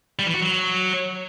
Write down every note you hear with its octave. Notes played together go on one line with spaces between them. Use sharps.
G3
E3
F#4
F#3